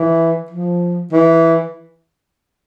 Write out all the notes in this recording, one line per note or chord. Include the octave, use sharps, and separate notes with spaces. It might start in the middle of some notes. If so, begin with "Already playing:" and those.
Already playing: E3
F3
E3